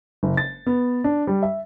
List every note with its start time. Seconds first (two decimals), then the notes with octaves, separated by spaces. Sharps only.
0.23 F#1
0.37 A6
0.66 B3
1.04 D4
1.27 G3
1.43 E5